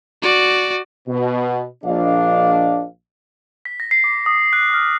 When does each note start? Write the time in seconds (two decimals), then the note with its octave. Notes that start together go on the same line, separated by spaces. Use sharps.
0.22 F#4 D5
1.08 B2
1.84 A#1 D4 D#5 F5
3.65 B6
3.80 A#6
3.91 C7
4.04 D6
4.26 D#6
4.53 F#6
4.74 F6